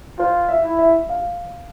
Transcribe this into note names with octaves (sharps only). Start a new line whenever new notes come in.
F4 C5
E5
E4
E5
F5